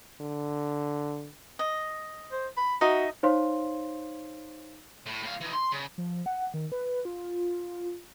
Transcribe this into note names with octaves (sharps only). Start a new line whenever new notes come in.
D3
D#5
C5
B5
D#4 F#4 D#5 E5
D#4 C5 C#5 F5 C6
A2
A2 F5
E3 D#4
C6
C#3
F3
F#5
D#3
B4
F4